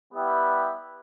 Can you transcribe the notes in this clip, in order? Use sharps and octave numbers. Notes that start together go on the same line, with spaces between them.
G3 B3 E4 G4 B4